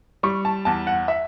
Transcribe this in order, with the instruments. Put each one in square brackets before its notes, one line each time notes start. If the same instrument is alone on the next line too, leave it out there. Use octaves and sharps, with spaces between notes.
[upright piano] G3 C#6
A5
E2 A5
F#5
E5